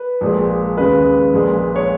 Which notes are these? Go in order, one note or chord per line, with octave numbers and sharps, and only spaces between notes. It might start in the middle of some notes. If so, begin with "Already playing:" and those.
Already playing: B4
A#1 A#2 G#3
D#2 C#3 G#3 B4
A#1 A#2 G#3
C#5